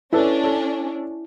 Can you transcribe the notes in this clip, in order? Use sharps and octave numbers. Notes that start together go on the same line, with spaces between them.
C#4 D4 E4 A4 B4
A4